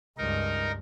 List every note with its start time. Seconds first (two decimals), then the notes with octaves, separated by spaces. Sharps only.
0.18 C#2 G2 D#4 A#4